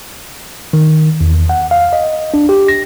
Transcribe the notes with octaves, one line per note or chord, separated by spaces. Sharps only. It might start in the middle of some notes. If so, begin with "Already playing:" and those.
D#3
E2
F#5
F5
D#5
D4
G4
A#6